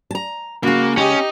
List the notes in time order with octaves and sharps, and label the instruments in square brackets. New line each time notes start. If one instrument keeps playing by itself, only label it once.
[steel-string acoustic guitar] A5 A#5
[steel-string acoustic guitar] C#3 G#3 [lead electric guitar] A#3 [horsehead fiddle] F#4
[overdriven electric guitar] C#4 [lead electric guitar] D#4 D#5 [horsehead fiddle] G4